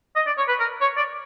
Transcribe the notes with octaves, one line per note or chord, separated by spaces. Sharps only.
D#5
D5
C#5
B4
A#4
C#5
D5